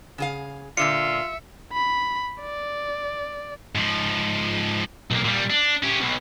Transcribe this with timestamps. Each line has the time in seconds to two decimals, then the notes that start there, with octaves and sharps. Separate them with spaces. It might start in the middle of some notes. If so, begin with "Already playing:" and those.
0.18 C#3 G#4 F5
0.77 A#2 D3 F4 D5 E5 C#7
1.73 B5
2.41 D5
3.75 G#2 F3
5.11 B1 A#3
5.25 A#2 G3
5.50 D4
5.83 C#4 G4
6.00 B1 B2